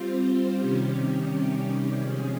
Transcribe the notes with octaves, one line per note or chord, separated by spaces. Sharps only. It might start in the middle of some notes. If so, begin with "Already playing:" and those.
Already playing: G3 C4 F4 C5
C3 D#3 G3 C#4 G4
C3 F3 G#3 C#4 G#4